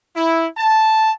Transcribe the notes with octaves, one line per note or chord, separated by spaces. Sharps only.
E4
A5